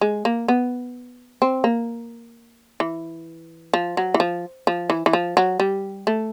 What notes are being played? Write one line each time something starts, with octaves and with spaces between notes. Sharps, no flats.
G#3
A#3
B3
C4
A#3
E3
F3
F#3
E3
F3
F3
E3
E3
F3
F#3
G3
A3